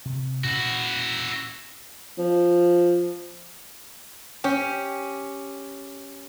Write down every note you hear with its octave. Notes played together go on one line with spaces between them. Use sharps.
C3
A#2 C#4 E4 F#4
F3
C#4 G4